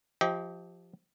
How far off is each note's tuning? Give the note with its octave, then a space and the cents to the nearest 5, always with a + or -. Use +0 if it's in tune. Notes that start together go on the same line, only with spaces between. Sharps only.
F3 +0 G4 +0 D#5 +35